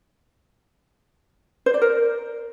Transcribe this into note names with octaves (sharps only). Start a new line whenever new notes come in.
C5
D5
A#4